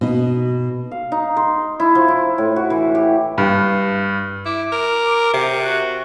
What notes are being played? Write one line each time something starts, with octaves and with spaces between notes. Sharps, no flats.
B2 D#4
F5
D#4
C6
E4
F3
E4
A2
F#4
E3
G4
G2
E4 D6
A#4
C3
F#4